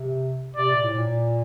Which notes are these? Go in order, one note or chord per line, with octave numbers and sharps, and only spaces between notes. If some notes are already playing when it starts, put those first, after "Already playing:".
Already playing: C3
C3 D5
A#2
A2
A#2